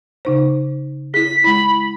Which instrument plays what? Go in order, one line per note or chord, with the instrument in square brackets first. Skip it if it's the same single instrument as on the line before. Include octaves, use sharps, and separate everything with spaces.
[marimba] C#3 D#4 C5
[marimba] E4 G#4 [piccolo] B6
[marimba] G#3 E4 [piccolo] B5